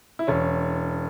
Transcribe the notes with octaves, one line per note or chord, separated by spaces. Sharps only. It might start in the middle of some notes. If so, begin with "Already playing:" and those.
E4
E1 C#4